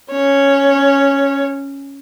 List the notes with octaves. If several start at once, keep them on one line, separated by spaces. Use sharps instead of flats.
C#4 C#5